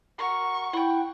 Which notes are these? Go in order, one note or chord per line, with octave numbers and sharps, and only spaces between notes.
F#4 A#4 C#6
E4 F#5 G5 B5